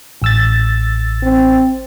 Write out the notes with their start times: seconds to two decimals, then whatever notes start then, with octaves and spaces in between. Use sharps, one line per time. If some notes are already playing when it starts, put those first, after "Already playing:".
0.22 A1 E6 A6
1.23 C4